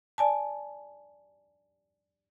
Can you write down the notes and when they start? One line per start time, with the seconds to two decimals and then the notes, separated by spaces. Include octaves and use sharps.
0.18 D5 G#5 A5